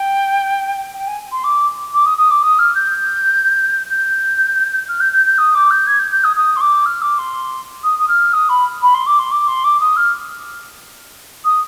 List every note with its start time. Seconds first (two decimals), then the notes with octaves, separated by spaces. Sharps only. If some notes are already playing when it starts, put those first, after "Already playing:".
Already playing: G5
0.95 G5
1.07 G#5
1.32 C6
1.44 D6
1.93 D6
2.06 D#6
2.18 D#6
2.30 D6
2.43 D#6
2.59 F6
2.75 G6
3.90 G6
4.88 F6
5.00 G6
5.13 G6
5.26 G6
5.38 D#6
5.54 D6
5.70 G6
5.87 G#6
5.99 G6
6.11 G6
6.24 D#6
6.36 D#6
6.56 C6
6.61 D6
6.86 F6
7.02 D6
7.18 C6
7.84 D#6
7.99 D#6
8.08 F6
8.33 D#6
8.49 B5
8.82 B5
8.94 C6
9.06 D6
9.19 C6
9.31 D6
9.47 C6
9.64 D6
9.80 D#6
9.96 F6
11.45 D#6